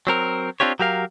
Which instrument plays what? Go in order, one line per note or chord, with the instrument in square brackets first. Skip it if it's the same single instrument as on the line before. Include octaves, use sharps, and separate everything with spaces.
[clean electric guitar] F#3 C4 A#4
C4 D4 F4 G4 C#5
F#3 G4 A#4 F5